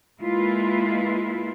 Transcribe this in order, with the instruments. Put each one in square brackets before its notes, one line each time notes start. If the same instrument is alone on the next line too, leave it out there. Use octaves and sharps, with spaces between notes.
[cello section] G#3 A#3 E4 F4 B4